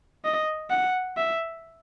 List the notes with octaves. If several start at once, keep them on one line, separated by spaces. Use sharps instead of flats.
D#5
F#5
E5